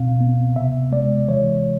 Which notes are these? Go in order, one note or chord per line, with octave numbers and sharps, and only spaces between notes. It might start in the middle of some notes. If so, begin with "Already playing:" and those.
Already playing: B2 C4 F5
B3
C3 E5
G#3 D5
E3 C#5